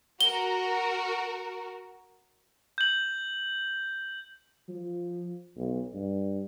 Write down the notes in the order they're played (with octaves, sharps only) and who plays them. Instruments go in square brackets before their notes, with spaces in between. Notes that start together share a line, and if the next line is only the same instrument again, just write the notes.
[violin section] F#4 A#4 [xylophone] G7
[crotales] G6 F#7
[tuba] F3
B1
G2